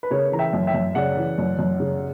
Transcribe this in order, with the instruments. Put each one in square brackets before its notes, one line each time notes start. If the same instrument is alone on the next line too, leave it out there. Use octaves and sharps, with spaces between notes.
[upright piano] B4
C#3 A#4 C#5
E3 A#5
E5 G5
F#2
E5 G5
F#2
C#3 D5 F#5
E3
F#2
F#2
C#3